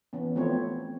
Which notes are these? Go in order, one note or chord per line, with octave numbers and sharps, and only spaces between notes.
E3 B3 C#4
F3 A3 B3 C4 E4 C#5